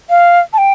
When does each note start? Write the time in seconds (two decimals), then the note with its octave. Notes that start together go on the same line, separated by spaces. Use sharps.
0.10 F5
0.53 A5
0.58 G5